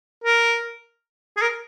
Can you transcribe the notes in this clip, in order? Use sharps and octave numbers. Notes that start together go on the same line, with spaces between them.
A#4
G#4
A#4